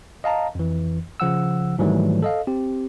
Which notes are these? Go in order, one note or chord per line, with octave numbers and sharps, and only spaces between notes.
D#5 F5 A5 A#5
F2 E3
C#3 F3 F#5 E6
G#2 D#3 E3 F#3 G3 A3
A4 D#5 F5
C4 G4